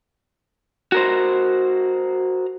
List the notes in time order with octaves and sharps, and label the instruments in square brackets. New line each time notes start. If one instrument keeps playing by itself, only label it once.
[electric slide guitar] F#4 A#4 C5